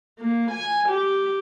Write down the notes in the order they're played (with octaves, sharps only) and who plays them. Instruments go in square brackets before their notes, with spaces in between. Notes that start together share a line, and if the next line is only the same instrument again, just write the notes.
[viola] A#3
G#5
G4